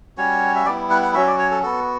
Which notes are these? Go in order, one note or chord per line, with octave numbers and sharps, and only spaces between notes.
G3 C#4 F#4 C#5
E5
G3 B3 E4 D5
F#5
F#5
F#3 C#4 F#4 E5
D5
C#5
A4
B3 F#4 A4